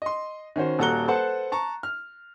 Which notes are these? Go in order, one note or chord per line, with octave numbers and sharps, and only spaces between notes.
D#5 C6
D#3 C#4 F#4 C5
D#1 F#4 A4 A#5 F#6 G7
A4 B4 C5 F#5 A5
A5 A#5 C#6
F6